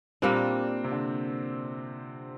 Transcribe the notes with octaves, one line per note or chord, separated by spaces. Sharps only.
A#2 G3 A#3 C4 D4
C3
D3